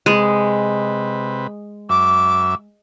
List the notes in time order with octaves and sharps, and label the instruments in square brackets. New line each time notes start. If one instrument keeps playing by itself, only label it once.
[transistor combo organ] C3 B4 [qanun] G#3
[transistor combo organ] F#2 E5 [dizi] D6